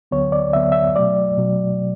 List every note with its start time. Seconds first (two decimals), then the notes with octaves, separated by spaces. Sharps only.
0.11 D2 D3 F#3 B3 C#5
0.32 D5
0.53 D2 D3 F#3 B3 E5
0.72 E5
0.96 B2 F#3 A3 D5
1.37 B2 F#3